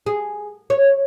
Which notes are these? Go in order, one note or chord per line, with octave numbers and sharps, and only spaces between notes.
G#4
C#5